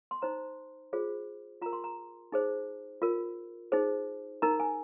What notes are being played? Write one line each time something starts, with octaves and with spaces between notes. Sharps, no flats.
C6
D#4 C5 A#5
F4 G#4 C5
F4 A#4 A#5
C6
A#5
D#4 G#4 C5
F4 A#4
D#4 G#4 C5
D#4 A#4 A#5
G#5